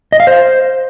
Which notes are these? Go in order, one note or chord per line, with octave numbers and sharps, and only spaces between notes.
D#5
F5
C5